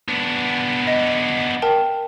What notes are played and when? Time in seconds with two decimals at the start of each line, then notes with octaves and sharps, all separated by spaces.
0.08 B3 D4
0.87 D#5
1.62 A#4 G5 A5